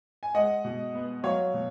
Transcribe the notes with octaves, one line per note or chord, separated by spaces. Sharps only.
G#5
G#3 D#5 F#5
B2
B3
F#3 C#5 F5
B2